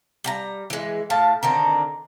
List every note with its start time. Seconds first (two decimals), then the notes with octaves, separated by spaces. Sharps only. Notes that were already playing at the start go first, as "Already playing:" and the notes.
0.24 G3 F#5 A#5
0.70 E3 G#3
1.10 A2 F5 A5
1.43 D3 D#3 C4 A#5